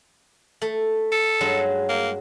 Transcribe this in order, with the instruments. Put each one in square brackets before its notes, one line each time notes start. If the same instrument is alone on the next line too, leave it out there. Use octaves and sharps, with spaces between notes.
[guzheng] A3
[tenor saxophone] A4
[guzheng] G2 F#3 G#3
[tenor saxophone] A#3